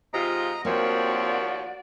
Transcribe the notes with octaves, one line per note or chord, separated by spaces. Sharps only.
G#2 C3 F4 D#5 A#5
D#2 F3 A#3 C4 F#4 C#5 D5